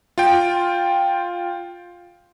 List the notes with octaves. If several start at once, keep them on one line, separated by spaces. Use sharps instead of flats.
F4 G5